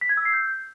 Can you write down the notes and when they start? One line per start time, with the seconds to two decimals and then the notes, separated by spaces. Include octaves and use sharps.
0.01 B6
0.09 G#6
0.17 E6
0.25 C7
0.33 G6